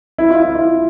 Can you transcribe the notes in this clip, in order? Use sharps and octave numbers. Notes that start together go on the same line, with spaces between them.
E4
F4
E4
F4